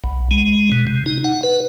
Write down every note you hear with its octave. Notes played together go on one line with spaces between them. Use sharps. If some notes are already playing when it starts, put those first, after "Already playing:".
B1
G#3
B2
C3
D#4
F#5
B4